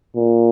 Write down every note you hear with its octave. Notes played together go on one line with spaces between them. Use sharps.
A#2